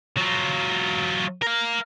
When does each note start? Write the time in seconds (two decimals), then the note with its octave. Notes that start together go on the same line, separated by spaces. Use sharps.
0.17 F#3 F4
1.42 A#4 F5